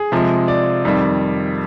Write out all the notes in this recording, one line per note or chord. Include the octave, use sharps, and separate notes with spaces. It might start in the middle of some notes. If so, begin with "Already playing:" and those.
Already playing: G#4
C3 F3 G#3
D5
F2 D#3 G3